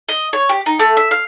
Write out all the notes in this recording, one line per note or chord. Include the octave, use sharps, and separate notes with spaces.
D#5
C#5
G4
D#4
A3
E5
F5